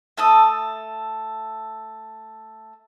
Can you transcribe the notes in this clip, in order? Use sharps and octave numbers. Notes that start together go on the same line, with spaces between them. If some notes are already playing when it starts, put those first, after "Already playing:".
A3 A4 D#6